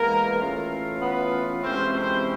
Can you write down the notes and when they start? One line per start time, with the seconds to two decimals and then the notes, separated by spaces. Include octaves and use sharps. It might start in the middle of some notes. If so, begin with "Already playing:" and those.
Already playing: E3 G#3 A#3 B3 A#4
0.40 E3 A3 C#4 F4
1.02 B3 B4
1.64 C3 E3 G#3 C4 C#4 E4 C5
1.94 C4 C5